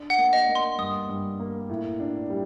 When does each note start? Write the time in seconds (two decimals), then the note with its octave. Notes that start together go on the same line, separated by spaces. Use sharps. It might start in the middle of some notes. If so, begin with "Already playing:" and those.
Already playing: D4
0.10 F#5
0.18 A#3
0.33 D#5
0.48 A#3
0.55 C6
0.78 G2 D#6
1.09 G2
1.40 A#3
1.69 A2
2.00 D4
2.30 G3